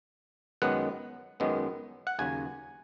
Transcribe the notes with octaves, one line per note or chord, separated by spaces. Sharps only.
F#2 D#3 G#3 B3 F#5
F#2 D#3 G#3 B3
F#5
D#2 C#3 F#3 G#5